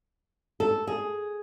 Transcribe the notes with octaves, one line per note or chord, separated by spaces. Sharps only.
A4
G#4